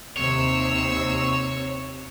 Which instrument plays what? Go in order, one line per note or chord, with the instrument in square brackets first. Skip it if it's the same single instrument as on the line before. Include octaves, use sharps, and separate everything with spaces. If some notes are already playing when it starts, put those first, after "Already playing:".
[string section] D#2 C3 E6 [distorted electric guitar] C#5